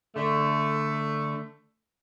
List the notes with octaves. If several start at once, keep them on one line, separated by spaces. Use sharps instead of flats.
D3 A3